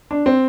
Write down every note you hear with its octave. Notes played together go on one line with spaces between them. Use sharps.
D4
C4